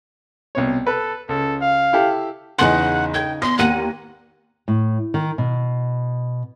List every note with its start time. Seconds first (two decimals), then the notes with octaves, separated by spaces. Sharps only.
0.55 C2 B2 C#5
0.87 A4 B4
1.29 C#2 A4
1.61 F5
1.93 E4 G4 A4
2.59 E2 C#3 D#4 F#5 C6
3.14 G5 G#6
3.42 E2 C6 A#6
3.59 D#2 A#3 F#5 D#7
4.68 A2
5.14 D#3
5.38 B2